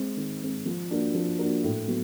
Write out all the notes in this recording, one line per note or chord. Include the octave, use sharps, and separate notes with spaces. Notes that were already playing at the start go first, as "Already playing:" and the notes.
Already playing: G#3 C4
D#3
G#3 C4
F3
A#3 D4 F#4 A#4
F3
A#3 D4 F#4 A#4
A2
F#3 B3